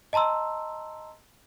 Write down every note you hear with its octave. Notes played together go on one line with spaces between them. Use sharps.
D#5 A5 A#5 C6 E6